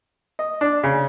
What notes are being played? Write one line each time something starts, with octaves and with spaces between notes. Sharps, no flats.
D#5
D4
C#3